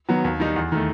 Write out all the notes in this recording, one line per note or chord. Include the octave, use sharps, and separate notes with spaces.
D#3 F#3 B3
D#2
D#3 G3 D#4
E2
D#3 A3